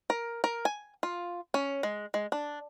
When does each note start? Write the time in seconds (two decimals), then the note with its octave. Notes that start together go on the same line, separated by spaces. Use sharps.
0.10 A#4
0.44 A#4
0.65 G#5
1.03 F4
1.54 C#4
1.83 G#3
2.14 G#3
2.32 D4